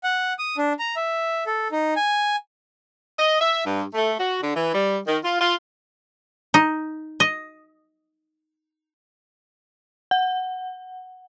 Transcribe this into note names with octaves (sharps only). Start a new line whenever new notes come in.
F#5
D#6
D4
A#5
E5
A4
D#4
G#5
D#5
E5
G2
A3
F#4
D3
E3
G3
D#3
F4
F4
D#4
D#5
F#5